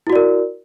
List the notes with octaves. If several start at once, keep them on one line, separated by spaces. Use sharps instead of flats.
E4 F#4 A#4 D5